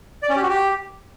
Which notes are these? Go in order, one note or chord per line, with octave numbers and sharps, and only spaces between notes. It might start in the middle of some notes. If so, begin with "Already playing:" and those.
D5
C#4
G4
F#4
G4